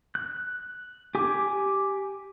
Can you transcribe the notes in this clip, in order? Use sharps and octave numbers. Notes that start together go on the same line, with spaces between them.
F#6
G4 G#5 D6